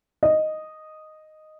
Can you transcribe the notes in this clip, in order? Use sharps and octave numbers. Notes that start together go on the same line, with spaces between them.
D#5